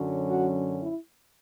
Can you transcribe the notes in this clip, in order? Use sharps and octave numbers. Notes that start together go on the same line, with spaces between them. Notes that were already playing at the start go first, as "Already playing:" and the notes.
Already playing: F#2 D3 F#3 C#4
F#4
E4